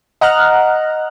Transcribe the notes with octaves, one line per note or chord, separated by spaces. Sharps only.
D#5 F#5 A#5 F6 F#6